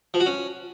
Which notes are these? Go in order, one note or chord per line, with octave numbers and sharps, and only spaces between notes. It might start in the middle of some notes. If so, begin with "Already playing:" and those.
F3
F#4
C#4